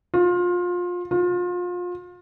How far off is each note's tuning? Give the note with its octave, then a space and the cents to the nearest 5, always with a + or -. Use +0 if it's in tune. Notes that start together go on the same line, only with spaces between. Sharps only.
F4 +25
F4 +30